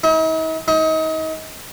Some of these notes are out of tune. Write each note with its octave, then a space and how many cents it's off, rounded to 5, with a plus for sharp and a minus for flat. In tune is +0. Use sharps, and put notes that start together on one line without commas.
D#4 +45
D#4 +30